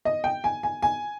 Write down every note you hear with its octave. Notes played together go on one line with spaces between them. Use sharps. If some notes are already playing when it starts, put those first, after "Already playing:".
D#5
G5
G#5
G#5
G#5